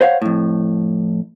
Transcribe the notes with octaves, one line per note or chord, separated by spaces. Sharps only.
C5 C#5 F5 F#5
F2 A2